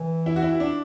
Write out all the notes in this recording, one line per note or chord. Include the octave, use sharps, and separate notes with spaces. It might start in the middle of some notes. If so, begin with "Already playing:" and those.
Already playing: E3
E4
F#4
E4
D4